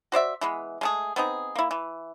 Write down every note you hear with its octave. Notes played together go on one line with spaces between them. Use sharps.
F#4 C5 D5 E5
E3 G#3 B3
G#3 A3 G#4
B3 C4 D#4 G#4
A#3 E4
E3